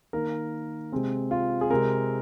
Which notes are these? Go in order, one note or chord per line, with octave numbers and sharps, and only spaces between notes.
D#3 A#3 A#4
C3 G#3 C4
F4
G#4
C3 G#3 C4 A#4